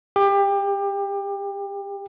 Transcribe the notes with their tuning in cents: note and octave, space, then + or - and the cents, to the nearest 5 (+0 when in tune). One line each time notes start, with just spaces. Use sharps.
G4 +25